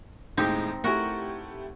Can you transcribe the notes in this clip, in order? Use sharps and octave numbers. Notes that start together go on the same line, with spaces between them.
D#2 A2 G#3 C4 D#4 G4
A3 E4 F#4 G4 A#4 F#5